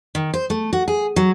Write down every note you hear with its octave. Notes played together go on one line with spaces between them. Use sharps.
D#3
C5
A3
F#4
G#4
F#3